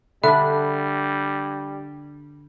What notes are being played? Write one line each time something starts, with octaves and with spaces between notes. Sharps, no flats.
D3 G3 D4 E5 B5